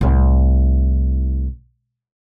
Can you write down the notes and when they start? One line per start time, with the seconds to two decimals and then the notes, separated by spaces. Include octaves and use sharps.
0.01 C2 A2